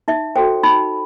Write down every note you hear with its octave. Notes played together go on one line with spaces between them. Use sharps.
D#4 E5
F#4 A4 C5 G5
D#4 B5